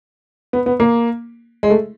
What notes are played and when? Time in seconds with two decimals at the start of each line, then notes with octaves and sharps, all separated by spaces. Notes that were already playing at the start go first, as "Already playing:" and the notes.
0.53 B3
0.66 B3
0.80 A#3
1.63 G#3
1.70 A3